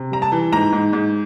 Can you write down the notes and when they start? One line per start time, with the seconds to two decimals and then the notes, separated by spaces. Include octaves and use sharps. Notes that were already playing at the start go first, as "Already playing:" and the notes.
Already playing: C3
0.11 G3 A#5
0.22 A5
0.32 E3
0.52 G#2 A#5
0.73 G#2
0.93 G#2